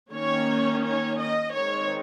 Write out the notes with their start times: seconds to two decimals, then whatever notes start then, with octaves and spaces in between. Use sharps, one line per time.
0.12 D#3 A#3 C#4 C#5
0.83 C#5
1.19 D#5
1.54 D#3 G#3 C4 C#5